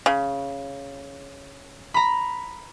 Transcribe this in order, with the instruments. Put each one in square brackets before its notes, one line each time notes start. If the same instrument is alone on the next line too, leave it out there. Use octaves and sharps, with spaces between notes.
[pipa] C#3
[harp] A#5 B5